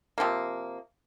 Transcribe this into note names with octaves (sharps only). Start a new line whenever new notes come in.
C3 F3 A#3